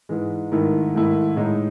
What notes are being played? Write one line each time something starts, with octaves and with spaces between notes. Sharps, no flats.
G#2 E3 G#3
G#2 D#3 A3 E4
G#2 D#3 A3 E4
A2 G#3 D#4